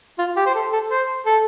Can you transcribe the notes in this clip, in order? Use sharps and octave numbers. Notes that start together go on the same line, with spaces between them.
F4
G4
C5
A4
A4
C5
A4